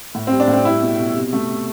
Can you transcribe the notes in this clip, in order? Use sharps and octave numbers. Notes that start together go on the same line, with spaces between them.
A2
C4
G3
D4
A2
C4
G3 E4
B2
B2
C3
A3
C3